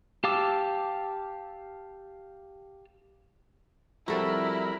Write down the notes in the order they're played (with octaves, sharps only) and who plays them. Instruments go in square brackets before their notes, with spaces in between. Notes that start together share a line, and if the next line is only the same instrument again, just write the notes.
[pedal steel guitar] G4 F5 A5 D6 E6
[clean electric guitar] F3 G3 C4 [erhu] E4 [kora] F#4 A4 [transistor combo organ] A#4 B5